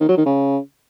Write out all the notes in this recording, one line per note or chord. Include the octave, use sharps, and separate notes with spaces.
D#3
F#3
D#3
C#3